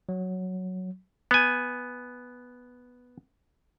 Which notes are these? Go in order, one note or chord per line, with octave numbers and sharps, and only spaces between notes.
F#3
B3 G#5